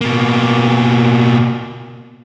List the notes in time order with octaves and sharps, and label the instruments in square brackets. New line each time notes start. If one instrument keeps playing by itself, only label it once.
[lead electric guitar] B2 A#3